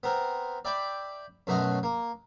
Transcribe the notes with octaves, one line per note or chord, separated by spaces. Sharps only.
B3 C4 A#4
D5 E5 G5 B5 D6
F#2 B2 A3 F#4 D#5 C6
A#3